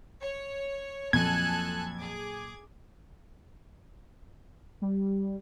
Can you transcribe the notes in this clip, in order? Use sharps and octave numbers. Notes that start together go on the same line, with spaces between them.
C#5
F2 A#2 F#3 A4 G#5 F#6 G#6
G#4 D6
G3